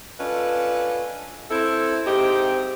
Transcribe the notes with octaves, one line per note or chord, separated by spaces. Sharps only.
C#4 D4 F4 A4 B4 D#5
C4 E4 A4
G#2 C4 D#4 G4